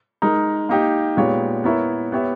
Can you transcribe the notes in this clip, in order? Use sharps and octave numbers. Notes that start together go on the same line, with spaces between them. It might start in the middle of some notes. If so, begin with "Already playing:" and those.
G#3 D#4 A#4
A#3 D#4 G4
A#2 G#3 B3 G4 C#5
B3 E4 A#4 C#5 E5
B3 G4 C#5 E5